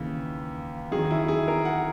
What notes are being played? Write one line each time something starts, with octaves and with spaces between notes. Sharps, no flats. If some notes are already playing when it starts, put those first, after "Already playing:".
Already playing: D#2 C#3 E3
E2 D#3 F#3 G#4
E4
G#4
A#4
F#5